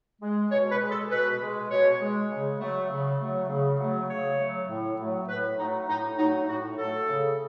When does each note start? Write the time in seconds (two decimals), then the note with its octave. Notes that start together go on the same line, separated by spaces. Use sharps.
0.21 G#3
0.51 B2 C#5
0.71 B4
0.81 G#3
0.91 A4
1.10 B2 B4
1.41 G#3
1.70 B2 C#5
2.00 G#3
2.30 C#3
2.60 F#3 A3
2.90 C#3
3.20 F#3 A3
3.49 C#3
3.79 F#3 A3
4.09 C#3 C#5
4.39 F#3 A3
4.69 A2
4.99 F#3 A3
5.28 A2 B4
5.58 F#3 A3 D#4
5.88 A2 D#4
6.18 F#3 A3 D#4
6.48 A2 F#4
6.78 F#3 A3 A4
7.08 C#3